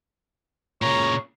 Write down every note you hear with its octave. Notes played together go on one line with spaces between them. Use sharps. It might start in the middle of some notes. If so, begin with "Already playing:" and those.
A#2 C#3 C#5 A#5